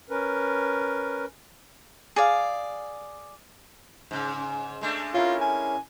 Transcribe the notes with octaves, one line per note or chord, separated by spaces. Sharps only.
C#4 A#4 B4
G#4 D5 F5
G#2 C#3
G#3 A3 D4
C#4 E4 F4 A#4
G#5